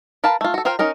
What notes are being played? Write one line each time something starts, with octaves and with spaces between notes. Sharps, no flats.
A#4 B4 F5 A5
A3 F4
F#4 A4
F4 A#4 C5 F5 G5
C#4 D#4 A#4 A#5